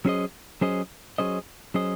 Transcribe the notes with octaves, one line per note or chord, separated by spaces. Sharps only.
F#3 C#4 G#4 C5 D#5
F#3 C#4 G#4 C5 D#5
F#3 C#4 G#4 C5 D#5
F#3 C#4 G#4 C5 D#5